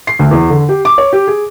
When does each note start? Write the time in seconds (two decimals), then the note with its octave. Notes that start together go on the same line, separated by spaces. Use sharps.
0.07 C7
0.19 D2
0.31 E2
0.50 D3
0.69 G4
0.85 D6
0.98 C#5
1.13 G4
1.27 G#4